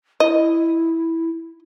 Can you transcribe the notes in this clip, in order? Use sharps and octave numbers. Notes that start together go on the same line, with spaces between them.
E4 D#5